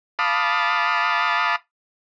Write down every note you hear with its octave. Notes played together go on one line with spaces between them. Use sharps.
F5 A5 B5 D6 D#6